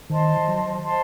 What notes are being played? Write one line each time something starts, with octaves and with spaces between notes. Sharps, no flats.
D#3 C5 D#5 A5 C6
D#3
F#3
C5 D#5 A5 C6